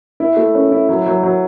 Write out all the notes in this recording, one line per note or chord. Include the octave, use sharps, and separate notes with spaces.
E4
A3
C#4
E4
F#3
F#3
F#3